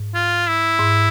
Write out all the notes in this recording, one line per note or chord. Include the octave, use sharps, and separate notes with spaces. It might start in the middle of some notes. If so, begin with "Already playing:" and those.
Already playing: G#2
F4
E4
G#2